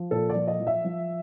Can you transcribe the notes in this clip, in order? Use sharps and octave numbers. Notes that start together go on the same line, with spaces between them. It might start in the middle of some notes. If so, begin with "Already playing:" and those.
Already playing: F3
A#2 A4
D5
F3
D#5
F3
E5
F3